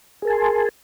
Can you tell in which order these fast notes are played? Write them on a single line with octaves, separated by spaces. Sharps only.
G#4 A#4 A5 G#5 C6